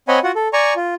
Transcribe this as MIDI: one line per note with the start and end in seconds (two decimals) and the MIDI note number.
0.08 0.19 60
0.08 0.19 73
0.08 0.19 75
0.08 0.19 78
0.08 0.19 80
0.08 0.19 83
0.24 0.31 65
0.24 0.31 66
0.24 0.31 78
0.35 0.48 69
0.53 0.74 74
0.53 0.74 80
0.53 0.74 82
0.53 0.74 85
0.76 0.95 65